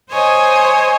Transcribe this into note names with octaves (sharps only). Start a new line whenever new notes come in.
C5 C#5 D#5 G#5